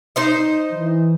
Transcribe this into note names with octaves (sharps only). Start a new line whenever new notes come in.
D#4 C5 D#5
E3